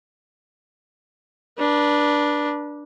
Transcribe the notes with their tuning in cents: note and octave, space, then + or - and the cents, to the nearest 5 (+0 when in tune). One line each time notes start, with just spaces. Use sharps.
D4 +0 B4 -35